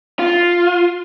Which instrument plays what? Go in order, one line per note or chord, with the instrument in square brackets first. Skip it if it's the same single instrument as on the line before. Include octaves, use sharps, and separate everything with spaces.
[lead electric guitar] F4